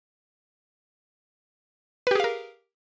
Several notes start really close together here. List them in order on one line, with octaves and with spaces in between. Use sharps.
B4 G4 G#4 F5 A#4